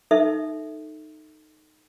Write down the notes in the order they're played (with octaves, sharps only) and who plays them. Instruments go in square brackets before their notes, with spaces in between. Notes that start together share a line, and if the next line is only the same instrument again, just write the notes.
[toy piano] D#4 A4 E5